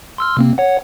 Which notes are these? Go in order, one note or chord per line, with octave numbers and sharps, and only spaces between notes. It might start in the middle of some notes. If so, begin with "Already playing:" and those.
C6 E6 F6
C3 A#3 C4
C#5 F#5